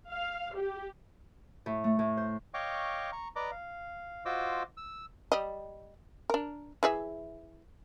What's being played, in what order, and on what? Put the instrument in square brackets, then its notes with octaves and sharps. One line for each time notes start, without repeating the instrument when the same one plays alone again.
[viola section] F5
G4
[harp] A2
A3
A2
C5
[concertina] C#5 D#5 F5 G5 C#6 D6
A#5 C#6
B4 D5 D#5 A#5 D6
F5
F4 F#4 C5 D#5 D6 E6
E6
[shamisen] G3 D#5
D4 A#4
E3 G#4 E5